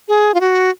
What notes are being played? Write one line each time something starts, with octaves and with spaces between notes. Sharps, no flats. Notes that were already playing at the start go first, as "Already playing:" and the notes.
G#4
F4
F#4